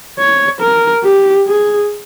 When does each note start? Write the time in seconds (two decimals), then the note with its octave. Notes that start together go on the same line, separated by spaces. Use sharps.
0.19 C#5
0.61 A#4
1.03 G4
1.48 G#4